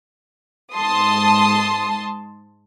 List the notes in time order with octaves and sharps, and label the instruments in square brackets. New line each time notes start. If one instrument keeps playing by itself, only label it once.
[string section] G#2 A5 C6 D#6